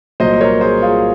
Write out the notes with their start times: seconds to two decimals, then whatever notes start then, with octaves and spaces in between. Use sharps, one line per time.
0.20 C2 A#2 F#3 C5 D#5
0.41 A#4 C#5
0.61 G#4 C5
0.83 F4 G#4